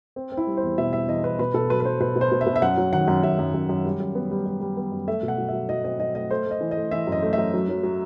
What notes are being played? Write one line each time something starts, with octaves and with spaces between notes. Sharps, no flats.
C4
C4
E4
G3
C5
E2
B2 E5
G3 E5
E2 D#5
E2 B4
B2 B4
B2 A4
F#3 B4
B4
F#3 C5
B2 B4
B2
C5
B2
E5
B2
E5
F#2 F#5
F#3
D#3 F#5
F#2
F#2 E5
F#2
F#2
F#2
G3
F#2
B3
G3
G3
G3
B3
F#2
A3 E5
B2
F#5
F#3
F#3 E5
F#3 D#5
C4 D#5
F#3 D#5
A3 D#5
A3 C5
A3
D#5
E3
D#5
A3
E3 E5
F#2
D#5
A3
E5
F#2
F#3
F#3
F#3